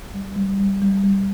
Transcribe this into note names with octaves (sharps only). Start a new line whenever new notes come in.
G3
G3
G3
G3
G3